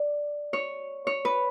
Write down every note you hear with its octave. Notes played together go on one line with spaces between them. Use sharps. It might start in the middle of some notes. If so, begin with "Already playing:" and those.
Already playing: D5
C#5
C#5
B4